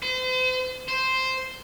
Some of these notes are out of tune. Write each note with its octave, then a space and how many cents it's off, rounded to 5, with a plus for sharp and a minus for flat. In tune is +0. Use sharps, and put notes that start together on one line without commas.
C5 -40
C5 +0